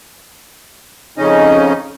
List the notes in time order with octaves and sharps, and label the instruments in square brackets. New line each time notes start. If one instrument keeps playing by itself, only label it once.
[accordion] F2 C#3 C#4 D#4 D#5